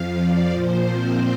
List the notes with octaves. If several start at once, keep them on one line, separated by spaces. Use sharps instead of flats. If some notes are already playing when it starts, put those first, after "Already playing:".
Already playing: F2 F3 F5
D5
A#2 F3 C5
C4